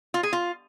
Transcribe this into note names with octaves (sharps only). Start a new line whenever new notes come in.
F4
G#4
F4